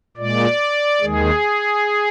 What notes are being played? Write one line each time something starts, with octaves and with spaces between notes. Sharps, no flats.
A#2 G#3 D5
D#2 D#3 G#3 G#4